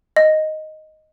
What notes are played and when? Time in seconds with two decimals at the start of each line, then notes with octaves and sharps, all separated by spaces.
0.16 D#5